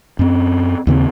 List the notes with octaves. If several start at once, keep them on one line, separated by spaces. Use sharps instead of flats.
F#2 C4
D#2 C#3 C4